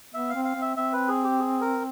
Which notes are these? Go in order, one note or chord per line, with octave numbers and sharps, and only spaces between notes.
B3 E5
F5
C4
F5
C4
E5
C4 E5
B4
G#4
G4
G#4
A#4